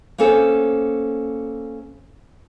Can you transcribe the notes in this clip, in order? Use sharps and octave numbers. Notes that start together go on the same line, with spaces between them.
A#3 B3 C#4 A4 C5